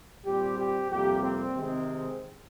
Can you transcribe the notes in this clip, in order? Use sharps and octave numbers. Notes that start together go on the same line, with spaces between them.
A#2 G3 C4 G4
G4
F2 C3 G3 A#3 G4
C4
C3 D#3 G#3 C4